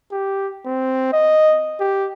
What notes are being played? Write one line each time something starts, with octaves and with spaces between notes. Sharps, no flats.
G4
C4
D#5
G4